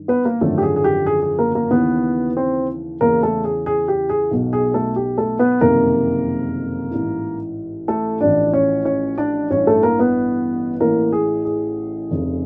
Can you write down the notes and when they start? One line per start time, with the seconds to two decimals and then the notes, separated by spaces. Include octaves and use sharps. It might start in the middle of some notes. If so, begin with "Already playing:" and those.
Already playing: G2 D#3
0.08 B3 B4
0.25 A#3 A#4
0.41 G#1 F#2 D3 F3 A3 A4
0.58 G4
0.63 G#4
0.76 G#4
0.84 G4
1.06 G#4
1.22 G#4
1.39 A#3 A#4
1.55 A#3 A#4
1.71 D#2 C#3 E3 B3 B4
2.37 C4 C5
3.01 E2 C#3 E3 A#3 A#4
3.23 A3 A4
3.44 G#4
3.66 G#4
3.88 G4
4.10 G#4
4.31 B1 B2
4.53 G#4
4.74 A3 A4
4.96 G4
5.18 A3 A4
5.39 B3 B4
5.61 F#1 F2 C3 D#3 A#3 A#4
6.91 A1 G#2 E3
7.88 A3 A4
8.21 A1 A2 F3 D4 D5
8.53 C#4 C#5
8.85 C#4 C#5
9.18 D4 D5
9.50 A1 G2 E3 C#4 C#5
9.67 A3 A4
9.83 A#3 A#4
9.99 B3 B4
10.80 A1 A2 E3 A#3 A#4
11.13 G#4
11.45 G#4
12.11 F1 F2 C#3